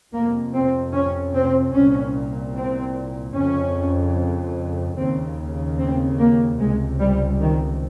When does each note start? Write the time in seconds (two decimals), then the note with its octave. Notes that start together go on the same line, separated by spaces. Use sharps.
0.13 F2 C3 A#3
0.54 C4
0.94 C#4
1.34 C4
1.74 C2 A#2 C#4
2.55 C4
3.36 F2 C#3 C#4
4.97 D#2 C#3 C4
5.78 C4
6.18 A#3
6.58 C#2 C3 G#3
6.99 G3
7.40 D#3